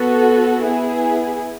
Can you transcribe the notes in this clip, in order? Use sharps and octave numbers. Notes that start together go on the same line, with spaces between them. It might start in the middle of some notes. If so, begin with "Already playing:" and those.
Already playing: B3 F#4 A4
B3 E4 G#4